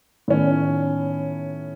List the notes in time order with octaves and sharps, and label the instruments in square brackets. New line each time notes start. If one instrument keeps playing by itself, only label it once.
[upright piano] A2 D#3 B3 C#4